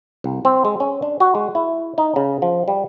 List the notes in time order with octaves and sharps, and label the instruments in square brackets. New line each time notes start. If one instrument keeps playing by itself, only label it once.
[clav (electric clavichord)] C2
C4
G#3
C#4
D4
F#4
G#3
E4
D#4
C#3
F3
G3